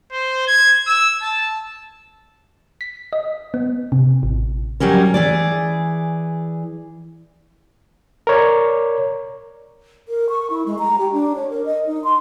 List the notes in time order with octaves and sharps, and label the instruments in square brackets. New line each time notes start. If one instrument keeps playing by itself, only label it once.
[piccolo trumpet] C5
G#6
E6
A5
[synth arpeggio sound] B6
D#5
B3
C3
A1
[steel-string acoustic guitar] F#3 G3 C#4 A#4
E3 G#4 D5
[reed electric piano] A#4 C#5 D5
[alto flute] A#4
C#6
E4
G#3
A#5
G4
D4
C#5
A#4
D#5
D#4
C6